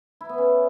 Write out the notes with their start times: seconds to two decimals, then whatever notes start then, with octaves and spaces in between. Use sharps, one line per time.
0.21 E4
0.29 B3
0.38 C#4